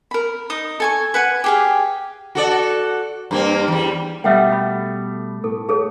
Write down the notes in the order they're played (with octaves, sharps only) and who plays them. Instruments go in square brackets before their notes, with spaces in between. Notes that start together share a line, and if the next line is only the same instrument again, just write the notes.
[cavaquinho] A#4 B5
D#4 D#6
A4 G#5 C#6
B4 F#5 G#5
G4 G#4 F5
[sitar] F#4 A4 D5
G2 A#3 C4
E2 G3
[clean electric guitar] B2 G3 A3 [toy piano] E5 F#5 G5
[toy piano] B5
[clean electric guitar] A2 [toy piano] A4
[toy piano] G#4 A4 C#5